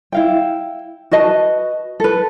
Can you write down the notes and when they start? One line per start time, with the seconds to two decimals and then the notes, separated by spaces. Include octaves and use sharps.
0.12 E4 F5 G5
1.11 F#4 B4 D#5 A5
2.00 A4 B4